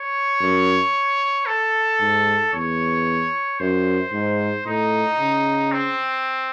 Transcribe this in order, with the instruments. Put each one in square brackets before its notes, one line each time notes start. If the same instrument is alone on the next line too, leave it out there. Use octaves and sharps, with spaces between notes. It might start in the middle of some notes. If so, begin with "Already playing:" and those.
Already playing: [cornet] C#5
[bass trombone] F#2
[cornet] A4
[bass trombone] G#2
[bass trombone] E2 [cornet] C#5
[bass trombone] F#2 [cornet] C5
[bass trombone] G#2
[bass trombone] A2 [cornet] D#4
[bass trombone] C#3
[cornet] C4